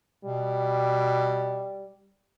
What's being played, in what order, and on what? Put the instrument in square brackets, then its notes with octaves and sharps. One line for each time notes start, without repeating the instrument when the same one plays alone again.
[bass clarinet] B2 [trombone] G3